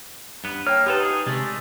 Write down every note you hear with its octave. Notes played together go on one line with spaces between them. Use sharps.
G2 B3
A#3 C#5 G5 F6
B3 D#4 F4 G4 A4 B4
G#4
C3 G#3 A3 D5